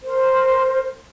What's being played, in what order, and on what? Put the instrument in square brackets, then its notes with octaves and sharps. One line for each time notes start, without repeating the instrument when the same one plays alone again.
[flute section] A#4 C5